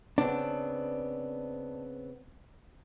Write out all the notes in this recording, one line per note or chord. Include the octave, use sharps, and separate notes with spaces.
C#3 B3 C4 D4